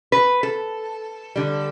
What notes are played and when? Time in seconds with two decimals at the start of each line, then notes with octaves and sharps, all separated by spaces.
0.12 B4
0.43 A4
1.36 D3 G3